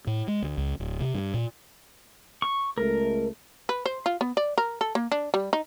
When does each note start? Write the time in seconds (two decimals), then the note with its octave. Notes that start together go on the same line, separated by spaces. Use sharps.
0.07 A2
0.28 G#3
0.42 D2
0.58 C#2
0.80 D1
1.00 C3
1.14 G2
1.34 A#2
2.42 C#6
2.78 C#2 G#3 A3 A#4
3.69 B4
3.86 C5
4.06 F4
4.21 B3
4.37 D5
4.58 A#4
4.81 A4
4.95 A#3
5.12 D4
5.34 G3
5.53 D#4